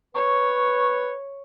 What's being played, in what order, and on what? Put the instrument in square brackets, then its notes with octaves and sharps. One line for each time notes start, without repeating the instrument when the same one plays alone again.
[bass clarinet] B4 [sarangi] C#5 [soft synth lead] C#6